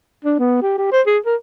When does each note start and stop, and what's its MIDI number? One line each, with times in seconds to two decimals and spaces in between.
0.25 0.36 62
0.39 0.59 59
0.62 0.76 67
0.78 0.92 67
0.92 1.02 72
1.07 1.18 68
1.26 1.35 70